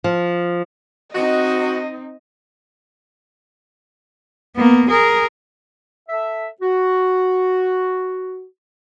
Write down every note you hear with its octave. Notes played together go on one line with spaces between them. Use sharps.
F3
C4 D#4 F#4 D#5
A#3 B3
G#4 A#4
A4 E5
F#4